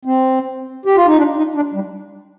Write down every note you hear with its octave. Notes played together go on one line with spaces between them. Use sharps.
C4
G4
F4
D#4
D4
D#4
D4
G3